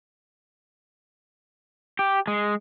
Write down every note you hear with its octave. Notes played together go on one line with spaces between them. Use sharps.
G4
G#3